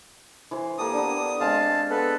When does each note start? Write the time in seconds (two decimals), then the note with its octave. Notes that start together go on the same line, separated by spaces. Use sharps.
0.51 E3 C5
0.78 A#3 G4 A4 D#6
0.93 B3 D4
1.40 G#3 C4 F5 A5
1.90 B3 A4 B4